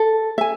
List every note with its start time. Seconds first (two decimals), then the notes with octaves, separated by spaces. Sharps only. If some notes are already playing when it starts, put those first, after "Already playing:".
Already playing: A4
0.38 E5 G#5